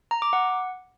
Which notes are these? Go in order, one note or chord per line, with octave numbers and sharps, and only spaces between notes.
A#5
D6
F#5